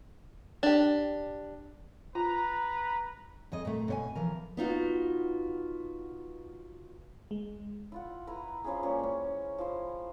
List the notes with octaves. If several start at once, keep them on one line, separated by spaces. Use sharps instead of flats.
D4 G4
F4 B4 A#5
F2 G#4 D#5
A#2 A3
B2 C#5 G#5
E3 F3 A#4
B3 D#4 F4 F#4
G#3
E4 F4 F#5
E4 B4 A#5
F3 C#4 E4 G#4
A#2 G3 C#4 C#6
G#3 C#4
F3 E4 C5